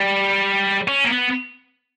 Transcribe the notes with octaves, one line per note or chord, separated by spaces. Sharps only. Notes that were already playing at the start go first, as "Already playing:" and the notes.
Already playing: G3
C#4
A#3
B3